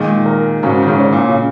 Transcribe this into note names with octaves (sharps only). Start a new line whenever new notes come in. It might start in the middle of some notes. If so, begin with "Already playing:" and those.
Already playing: A#2 D#3 G#3
A#4
G#2 C#3 F#4
D#3
G#2 C#3
C#5
A#2
C#3